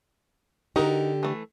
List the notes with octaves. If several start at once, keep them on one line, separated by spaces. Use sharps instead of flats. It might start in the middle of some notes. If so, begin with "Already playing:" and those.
D3 D#4 F#4 G4 A#4
E3 A3